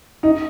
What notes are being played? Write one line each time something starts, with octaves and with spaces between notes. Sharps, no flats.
D#4